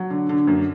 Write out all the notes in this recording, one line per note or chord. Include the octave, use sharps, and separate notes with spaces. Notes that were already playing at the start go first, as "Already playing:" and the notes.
Already playing: F#3
D3
D3
F#2